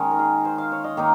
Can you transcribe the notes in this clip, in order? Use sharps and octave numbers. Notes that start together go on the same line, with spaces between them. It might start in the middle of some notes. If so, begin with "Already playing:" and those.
Already playing: D#3 G#3 C#4
A#4
G#4
C5
F5
C#5
D#5
D#3 A#3 D#4 F5